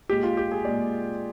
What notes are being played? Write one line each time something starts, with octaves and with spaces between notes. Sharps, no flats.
A#2 G#3 G4
F4
G4
G#4
A#2 G#3 D5